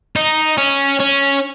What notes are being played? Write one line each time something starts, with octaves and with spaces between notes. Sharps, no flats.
D#4
C#4
C#4